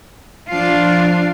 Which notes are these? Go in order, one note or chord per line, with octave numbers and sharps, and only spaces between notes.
F3 D4 F4 C7